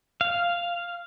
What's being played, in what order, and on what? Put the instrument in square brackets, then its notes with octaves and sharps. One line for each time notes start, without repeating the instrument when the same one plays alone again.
[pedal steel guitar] F5